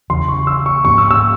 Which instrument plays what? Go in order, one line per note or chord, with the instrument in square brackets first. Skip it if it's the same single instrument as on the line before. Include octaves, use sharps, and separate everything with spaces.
[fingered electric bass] E2 C#3 E3 [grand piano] C6
[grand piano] C#6
E6
C#6
[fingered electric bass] G#2 F3 A#3 C#4 [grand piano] C#6
[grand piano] E6
E6